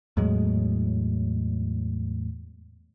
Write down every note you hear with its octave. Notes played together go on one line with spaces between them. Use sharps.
E2 A2 F#3 G#3